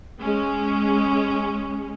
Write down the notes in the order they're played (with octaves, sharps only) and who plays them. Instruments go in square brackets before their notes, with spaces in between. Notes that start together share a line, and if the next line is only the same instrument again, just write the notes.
[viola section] G#3 C#4